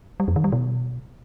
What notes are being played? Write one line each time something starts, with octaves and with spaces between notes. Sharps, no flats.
G3
F2
D#3
G3
B2